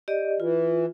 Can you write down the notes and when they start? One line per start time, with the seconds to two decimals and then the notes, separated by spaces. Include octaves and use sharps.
0.08 G4 D5 D#5
0.40 E3 F4